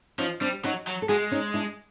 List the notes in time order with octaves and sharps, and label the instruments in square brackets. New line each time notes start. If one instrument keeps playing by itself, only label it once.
[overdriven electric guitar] F3 [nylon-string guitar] C#4 D#4
[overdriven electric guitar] G3 [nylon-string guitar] C4 D4
[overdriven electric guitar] F#3 [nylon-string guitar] C#4 D#4
[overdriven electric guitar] F#3
[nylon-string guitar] A4
[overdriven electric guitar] G#3 [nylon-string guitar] F#4 G#4
[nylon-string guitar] C#4 D#4
D4 E4